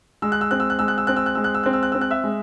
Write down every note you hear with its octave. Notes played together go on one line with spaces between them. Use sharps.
G#3 E6
F#6
E6
C4 F#6
E6
F#6
G#3 E6
F#6
E6
C4 F#6
E6
F#6
G#3 E6
F#6
E6
C4 F#6
E6
F#6
C4 E6
F#6
E5 E6
G#3